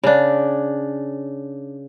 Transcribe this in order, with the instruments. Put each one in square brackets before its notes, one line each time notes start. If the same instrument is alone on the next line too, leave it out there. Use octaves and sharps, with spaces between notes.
[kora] C#3 D4